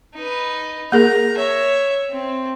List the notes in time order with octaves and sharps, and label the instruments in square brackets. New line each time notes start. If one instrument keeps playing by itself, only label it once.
[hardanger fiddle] D#4 B4
[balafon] A#3 G#4 A#4 [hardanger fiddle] A#5
[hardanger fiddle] C#5 E5
C4